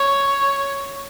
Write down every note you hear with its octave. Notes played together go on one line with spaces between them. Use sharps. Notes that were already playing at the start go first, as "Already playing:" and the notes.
Already playing: C#5